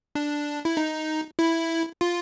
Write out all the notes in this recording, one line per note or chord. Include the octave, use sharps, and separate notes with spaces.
D4
E4
D#4
E4
F4